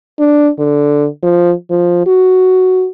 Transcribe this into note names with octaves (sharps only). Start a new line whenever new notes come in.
D4
D3
F3
F3
F#4